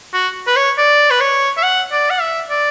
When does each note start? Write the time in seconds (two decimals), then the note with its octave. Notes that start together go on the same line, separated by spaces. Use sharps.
0.13 F#4
0.47 B4
0.56 C#5
0.78 D5
1.10 B4
1.20 C#5
1.57 E5
1.63 F#5
1.92 D5
2.10 F#5
2.21 E5
2.50 D5